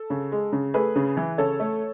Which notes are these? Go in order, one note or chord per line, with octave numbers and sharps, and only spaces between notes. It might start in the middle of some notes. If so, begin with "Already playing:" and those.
Already playing: A4
C#3
G#3
C#3
A3 G#4 B4
C#3
E3
C#3 A4 C#5
A3